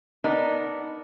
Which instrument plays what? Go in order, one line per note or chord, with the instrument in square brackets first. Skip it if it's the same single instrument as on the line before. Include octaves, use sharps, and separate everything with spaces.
[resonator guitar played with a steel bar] B3 D4 D#4 A#4